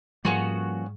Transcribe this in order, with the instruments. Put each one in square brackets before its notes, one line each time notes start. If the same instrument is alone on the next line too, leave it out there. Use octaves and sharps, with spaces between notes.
[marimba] G#2 [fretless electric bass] F3 A#3 [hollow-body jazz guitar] G3 F5 [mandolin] B3 C#4 F#4